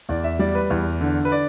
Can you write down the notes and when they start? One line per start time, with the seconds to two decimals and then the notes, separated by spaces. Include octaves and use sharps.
0.09 E2 D5
0.24 E5
0.39 G3 D5
0.55 B4
0.70 E2
1.01 D3
1.25 B4
1.32 D5